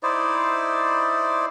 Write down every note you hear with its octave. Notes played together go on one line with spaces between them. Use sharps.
D#4 E4 C5 D5